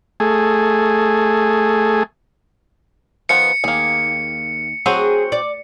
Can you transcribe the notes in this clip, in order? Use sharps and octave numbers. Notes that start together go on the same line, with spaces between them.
A3 G#4
D#3 F3 B3 C#7
D#2 A#3 G#4
F#3 C4 F#4 G#4
D5